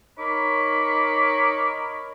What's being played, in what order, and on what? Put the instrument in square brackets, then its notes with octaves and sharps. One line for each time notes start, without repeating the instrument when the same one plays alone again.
[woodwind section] D#4 A#4 C#5 B5 C#6 D6